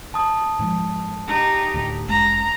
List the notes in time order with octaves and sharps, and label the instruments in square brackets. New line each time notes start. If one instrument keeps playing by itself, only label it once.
[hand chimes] A5 D#6
[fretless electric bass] G#2 F3 G#3
[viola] D#4 G4
[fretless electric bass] D2 A2
[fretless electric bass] G1 F#2 G#3 [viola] A#5